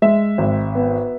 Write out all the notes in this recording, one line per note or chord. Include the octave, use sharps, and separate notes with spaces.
G#3 E5
G#1
B3